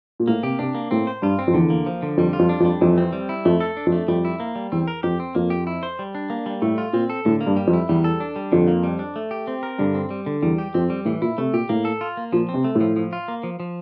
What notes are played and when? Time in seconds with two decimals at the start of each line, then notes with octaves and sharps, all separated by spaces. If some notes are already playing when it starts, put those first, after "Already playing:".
0.20 A#2
0.28 A2 A#3
0.43 C3 G4
0.59 C3 D4
0.75 A#3
0.91 A2 C4
1.07 C5
1.22 G2 F4
1.39 C4
1.47 F2
1.54 E2 D3
1.70 A#3
1.86 F3
2.02 D3
2.17 F2 G3
2.33 F4
2.39 F2
2.49 D4
2.60 F2
2.65 G3
2.81 F2 E3
2.98 C4
3.13 G3
3.29 E4
3.45 F2 A3
3.60 A4
3.77 D4
3.86 F2
3.92 A3
4.08 F2 G3
4.25 E4
4.40 A#3
4.56 G3
4.72 E2 C4
4.88 A#4
5.03 F2 G4
5.20 C4
5.35 F2 A#3
5.50 G4
5.67 E4
5.83 C5
5.99 G3
6.15 D4
6.30 A#3
6.46 G3
6.62 A2 A3
6.78 F4
6.93 A#2 C4
7.10 A4
7.25 A2 D3
7.41 A#3
7.46 G2
7.57 G3
7.67 F2
7.73 E4
7.89 E2 G3
8.04 A4
8.20 D4
8.36 G3
8.52 F2 D3
8.67 A#3
8.83 G3
8.99 D4
9.16 A3
9.31 G4
9.47 C4
9.63 A#4
9.79 G2 D3
9.95 C4
10.10 G3
10.26 D3
10.42 E2 G3
10.58 G4
10.74 F2 C4
10.90 G3
11.05 A2 E3
11.22 A#2 E4
11.38 C3 A3
11.53 A#2 G4
11.69 A2 A#3
11.85 A4
12.01 F4
12.17 A#3
12.32 A#2 F3
12.49 C4
12.54 C3
12.64 A3
12.75 A2
12.80 F3
12.96 F3
13.13 F4
13.28 A#3
13.43 F3
13.60 F3